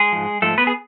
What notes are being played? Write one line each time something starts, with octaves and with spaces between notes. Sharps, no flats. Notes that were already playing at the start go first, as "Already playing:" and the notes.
Already playing: G#3 G#4
G#2 F3
G#2 F3 A3 A4
B3 B4
G#4